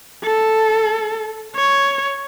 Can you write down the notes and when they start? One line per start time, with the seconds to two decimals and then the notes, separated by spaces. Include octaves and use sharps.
0.24 A4
1.56 C#5